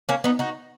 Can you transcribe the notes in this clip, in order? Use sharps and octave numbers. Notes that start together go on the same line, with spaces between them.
A#3 C#4
B3 D#4
D#4 F#4